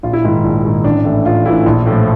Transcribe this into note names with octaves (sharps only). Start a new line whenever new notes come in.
A#1 F4
E4
G#2 D#3 E4
A#1
G#2 D#3
A1 D4
A2 E3
A1 F4
A2 E3 E4
A#1
A2 F3